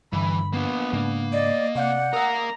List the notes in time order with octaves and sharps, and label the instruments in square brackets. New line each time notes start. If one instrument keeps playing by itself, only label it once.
[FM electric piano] G2 D3 [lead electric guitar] E3 [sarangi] B5
[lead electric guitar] A#3 D4 [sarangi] B3
[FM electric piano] G#2 C#3 D4 [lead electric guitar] A#3
[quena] D5 [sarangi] D#5
[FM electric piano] C3 F5 G6 [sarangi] D5 [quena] F#5
[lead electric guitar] A#4 F5 [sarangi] A#5 [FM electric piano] D#6 E6